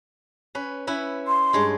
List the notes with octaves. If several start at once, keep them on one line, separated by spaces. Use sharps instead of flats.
C#4 B4
C#4 E4 B4
C6
G2 G#3 C#5